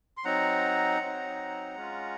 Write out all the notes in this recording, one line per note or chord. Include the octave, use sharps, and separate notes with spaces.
C6
F#3 C4 D#4 F#5 A#5
F#3 C4 D#4
G#3 C#4 F4